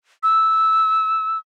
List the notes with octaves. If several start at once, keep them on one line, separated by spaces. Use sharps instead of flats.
E6